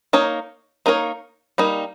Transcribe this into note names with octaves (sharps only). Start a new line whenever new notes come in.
A#3 D#4 A#4 C#5
A#3 D#4 A#4 C#5
G3 A#3 D#4